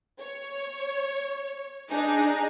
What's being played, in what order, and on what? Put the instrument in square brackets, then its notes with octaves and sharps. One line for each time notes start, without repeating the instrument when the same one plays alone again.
[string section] C#5
D4 D#4 G#4